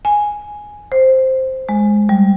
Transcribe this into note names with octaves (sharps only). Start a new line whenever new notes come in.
G#5
C5
G#3
G3